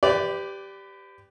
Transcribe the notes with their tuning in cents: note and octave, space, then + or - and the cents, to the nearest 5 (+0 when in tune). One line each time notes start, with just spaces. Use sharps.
G4 +0 B4 +30 D5 -10